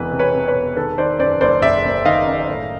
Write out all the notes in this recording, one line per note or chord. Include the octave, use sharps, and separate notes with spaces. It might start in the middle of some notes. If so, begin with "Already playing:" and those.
Already playing: E1 E2 C3 E3 B4
C3
B4 C#5
C3
B4 C#5
E1
D#3 A4 B4
D#3 C5 D5
F#2 C5 D5
F#1 C5 D5
F#1 D5 E5
F#1
D#3 D#5 F5
F#2
A2